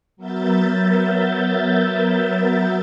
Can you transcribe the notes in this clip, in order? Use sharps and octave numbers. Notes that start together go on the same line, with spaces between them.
F#3 B3 A#4 E5 G6 A6